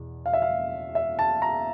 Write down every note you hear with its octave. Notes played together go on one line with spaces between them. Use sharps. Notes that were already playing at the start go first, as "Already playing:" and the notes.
Already playing: E2 B2
F5
E5
F5
E5
A5
A#5